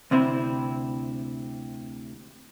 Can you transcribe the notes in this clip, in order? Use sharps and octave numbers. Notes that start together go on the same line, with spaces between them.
D2 C3 C4 E4 B5